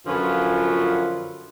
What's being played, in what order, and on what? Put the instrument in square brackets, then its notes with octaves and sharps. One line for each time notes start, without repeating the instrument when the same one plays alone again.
[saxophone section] F#2 D3 F3 C#4 F4 B4